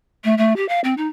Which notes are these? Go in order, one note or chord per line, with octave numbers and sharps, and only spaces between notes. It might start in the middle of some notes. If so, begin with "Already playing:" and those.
A3
A3
G4
F5
C4
D#4